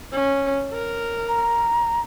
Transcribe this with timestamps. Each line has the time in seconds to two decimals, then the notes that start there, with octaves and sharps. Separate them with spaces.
0.12 C#4
0.73 A#4
1.28 A#5